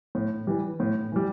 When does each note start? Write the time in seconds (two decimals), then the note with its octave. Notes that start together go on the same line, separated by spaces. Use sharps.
0.15 A2
0.47 E3 G3
0.80 A2
1.12 E3 G3